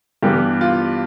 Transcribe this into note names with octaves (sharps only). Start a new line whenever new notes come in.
G2 E3 G3 B3 G4
F4